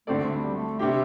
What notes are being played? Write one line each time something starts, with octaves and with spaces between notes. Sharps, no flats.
D2 D3 A3 C4 A4 D5
A3
G3
A3
C3 G3 C4 D4 G4